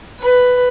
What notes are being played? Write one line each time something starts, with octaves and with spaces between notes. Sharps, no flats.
B4